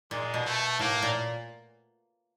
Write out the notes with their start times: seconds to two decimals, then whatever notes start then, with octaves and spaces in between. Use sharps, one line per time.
0.11 A#2 G#3
0.34 B2
0.46 A3
0.79 A2 A#3
1.02 A#2